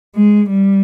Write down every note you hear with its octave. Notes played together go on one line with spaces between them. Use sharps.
G#3
G3